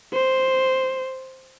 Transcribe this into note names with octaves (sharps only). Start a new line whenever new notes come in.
C5